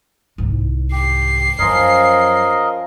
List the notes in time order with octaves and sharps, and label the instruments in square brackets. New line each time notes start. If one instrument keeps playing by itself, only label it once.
[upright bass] C2 G#2
[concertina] G4 [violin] C7
[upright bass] F#2 [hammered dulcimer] F3 C#4 [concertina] A#4 D#5